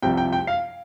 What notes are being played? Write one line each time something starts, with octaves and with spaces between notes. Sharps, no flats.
C2 C3 F3 G5
G5
G5
F5